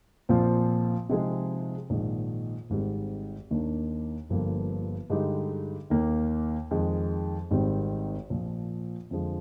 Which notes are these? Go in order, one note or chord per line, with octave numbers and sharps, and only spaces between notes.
A#1 A#2 F3 C4 F4
C3 F3 G#3 D#4 G#4
A#1 G#2 D#3
G#1 G#2 D#3 G3 C4
D#2 D#3 A#3 D4
G1 G2 D3 F3 A#3
G2 D3 G#3 D#4 G4
D#2 D#3 A#3
F2 D#3 G#3
G#1 G#2 D#3 G3 C4
A#1 A#2 F3
F2 D3 F3 G#3